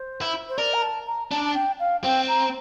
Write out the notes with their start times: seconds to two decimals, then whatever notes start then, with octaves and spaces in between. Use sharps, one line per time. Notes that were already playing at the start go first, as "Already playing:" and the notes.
Already playing: C5
0.22 E4
0.49 C5
0.58 A#4 D5
0.74 A#5
0.82 A5
1.07 A#5
1.31 D4 A5
1.45 A5
1.55 G5
1.80 F5
2.04 C4 G5
2.28 A#5